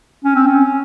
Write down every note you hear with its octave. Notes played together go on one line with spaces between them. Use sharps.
C#4
C4
C#4